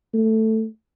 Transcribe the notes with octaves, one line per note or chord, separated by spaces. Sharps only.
A3